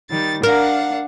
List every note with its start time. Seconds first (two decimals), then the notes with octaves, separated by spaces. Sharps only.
0.11 D#3 G3 A6
0.43 D4 A#4 F5 F#5